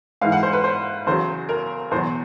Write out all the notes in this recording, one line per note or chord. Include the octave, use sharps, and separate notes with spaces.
G#2 E3 F5
F#5
C5
B4
C5
E2 C#3 F#3 C5
A#4
E2 B2 F#3 C5